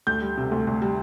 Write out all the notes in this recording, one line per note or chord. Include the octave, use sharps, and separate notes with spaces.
D2 G6
G3
C3
D2
D2
G3